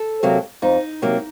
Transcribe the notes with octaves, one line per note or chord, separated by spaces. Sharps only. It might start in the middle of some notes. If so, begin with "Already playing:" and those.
Already playing: A4
C3 F#3 A#3
F2 D#4
C3 F#3 A#3